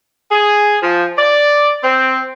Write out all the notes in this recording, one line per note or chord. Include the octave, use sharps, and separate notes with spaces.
G#4
F3
D5
C4